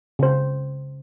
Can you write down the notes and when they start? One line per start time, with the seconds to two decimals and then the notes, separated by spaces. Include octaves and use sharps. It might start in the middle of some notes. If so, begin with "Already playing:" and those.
0.19 C#3 C5